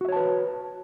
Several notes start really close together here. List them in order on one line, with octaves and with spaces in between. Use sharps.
F#4 E5 C#5 A5 B4